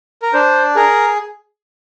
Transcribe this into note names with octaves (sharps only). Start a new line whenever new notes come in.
A#4
D4 C5
G#4 A#4